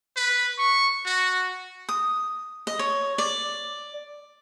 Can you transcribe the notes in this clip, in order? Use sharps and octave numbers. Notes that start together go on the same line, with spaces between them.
B4
C#6
F#4
D#6
D#5
C#5
D5